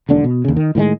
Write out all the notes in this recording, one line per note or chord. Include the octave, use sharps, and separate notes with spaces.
E1 D#2 D3 D4
B2
D#2 C#3
D#3
A2 D#3 F#3 G#3